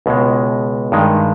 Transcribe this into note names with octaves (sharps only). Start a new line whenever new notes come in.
C#2 B2 G#3
G2 D#3 G#3